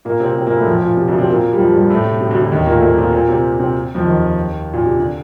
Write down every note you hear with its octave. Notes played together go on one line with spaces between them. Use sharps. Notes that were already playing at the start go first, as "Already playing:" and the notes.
A#2 A#3
C3 C4
C3 C4
A#2 A#3
A2 A3
F2 F3
A#2
C3
D2 D3
C3 C4
A#2 A#3
G3
F2 F3
G2 G3
A2 A3
C3
C3
D2 D3
D2 D3
D#2 D#3
A#2 A#3
A3
A#2 A#3
C4
A#2 A#3
A#2 A#3
C3 C4
C3 C4
F2 F3
D#2 D#3
A#2
C3
D3